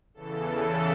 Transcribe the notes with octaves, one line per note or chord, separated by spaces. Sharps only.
E2 C#3 E3 A4